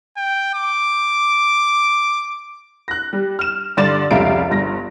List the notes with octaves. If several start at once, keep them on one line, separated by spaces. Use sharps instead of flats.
G5
D6
F#6 A#6
G3
F6 E7
G2 D3 D5 C6 A6 E7
F1 C#2 G3 E5 F5 D7
G1 G2 A#6